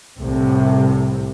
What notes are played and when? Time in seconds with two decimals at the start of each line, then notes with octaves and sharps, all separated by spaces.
0.19 C2 A2 C3